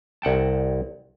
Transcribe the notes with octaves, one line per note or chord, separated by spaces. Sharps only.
C2 F#5 G5 A5